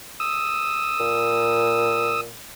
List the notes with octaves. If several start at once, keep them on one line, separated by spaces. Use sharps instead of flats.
D#6 E6
A#2